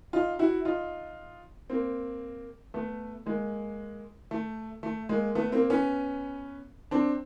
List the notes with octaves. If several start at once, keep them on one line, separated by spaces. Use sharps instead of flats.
D#4 F4
E4 F#4
D#4 F4
A#3 C4
A3 B3
G#3 A#3
A3
A3
G#3 A#3
A3 B3
A#3 C4
B3 C#4
C4 D4